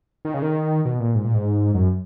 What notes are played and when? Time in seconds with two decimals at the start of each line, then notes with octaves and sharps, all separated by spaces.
0.25 D#3
0.34 C#3
0.42 D#3
0.85 B2
1.00 A#2
1.15 G#2
1.25 A#2
1.35 G#2
1.74 F#2